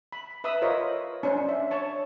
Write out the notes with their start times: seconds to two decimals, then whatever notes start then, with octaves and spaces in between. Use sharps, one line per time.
0.12 B5
0.44 B4 E5 B5 D#6 E6
0.62 F4 A#4 C5 C#5 D#5
1.23 C#4 D4 C5
1.49 E5
1.71 C#5 A5 C#6